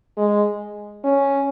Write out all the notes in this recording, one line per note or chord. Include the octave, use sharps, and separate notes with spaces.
G#3
C#4